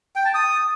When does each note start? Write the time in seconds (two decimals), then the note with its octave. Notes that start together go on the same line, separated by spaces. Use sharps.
0.16 G5
0.25 A5
0.34 D#6